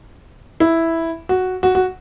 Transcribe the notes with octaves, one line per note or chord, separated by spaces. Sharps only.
E4
F#4
F#4
F#4